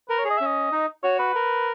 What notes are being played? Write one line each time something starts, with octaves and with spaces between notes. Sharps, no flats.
A#4 B4
C#5
G#4
D#5
E5
C#4
D#5
D#4
F#4 C#5
B4
A#4